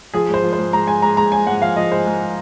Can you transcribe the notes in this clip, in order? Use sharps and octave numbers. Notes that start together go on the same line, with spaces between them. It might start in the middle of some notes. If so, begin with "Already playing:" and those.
F3 G#4
G#2
C5
F3
C5
G#2
G#2 A#5
G#2 G#5
G#2 A#5
G#3 A#5
G#3 G#5
G#2 F#5
F3 F5
F3 D#5
G#2 C5
G#2